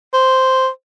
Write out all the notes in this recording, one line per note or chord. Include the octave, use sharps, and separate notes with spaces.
C5